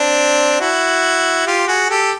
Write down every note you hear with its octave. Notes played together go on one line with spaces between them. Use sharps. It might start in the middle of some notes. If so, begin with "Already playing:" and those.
Already playing: C4 D4
E4 F#4
F4 G4
F#4 G#4
G4 A4